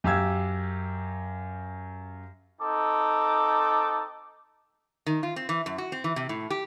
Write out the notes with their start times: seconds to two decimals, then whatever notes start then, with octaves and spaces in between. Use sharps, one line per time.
0.04 F#2 G4 F5 E6 G#6
2.60 C4 D#4 A4 D6
5.06 D#3
5.23 F4
5.36 C4
5.49 E3
5.66 F#2
5.78 F#4
5.92 C4
6.04 E3
6.16 C3
6.29 A2
6.50 G4